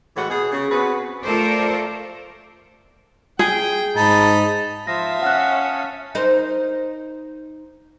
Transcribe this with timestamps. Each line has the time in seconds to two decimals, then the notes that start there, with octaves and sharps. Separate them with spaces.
0.17 A2 E3 G#3 F#4
0.30 B2 G#4
0.52 C#3
0.71 B3 C4 F#4 G#4 B4
1.24 A3 F4 A4 A#4 C5 D5
3.39 G#4 G5
3.97 G#2 D#4 A5 B5
4.87 F3 E5 F5 A5 D#6 A#6
5.22 C#4 F#5 F6 F#6
6.15 D#4 A#4 C5